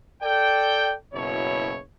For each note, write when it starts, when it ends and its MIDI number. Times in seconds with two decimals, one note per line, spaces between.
0.23 0.93 69
0.23 0.93 74
0.23 0.93 79
1.13 1.78 30
1.13 1.78 47
1.13 1.78 64
1.13 1.78 73